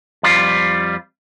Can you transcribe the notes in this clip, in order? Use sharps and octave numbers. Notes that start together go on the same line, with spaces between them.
F2 G3 F4